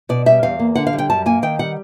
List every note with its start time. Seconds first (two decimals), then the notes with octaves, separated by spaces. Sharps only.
0.09 B2 D5
0.26 G3 E5
0.43 E2 F5
0.59 A#3
0.75 D3 F#5
0.87 F5
0.93 G3
0.98 G5
1.10 F#2 A5
1.26 A#3 G#5
1.42 D#3 G5
1.59 G3 F#5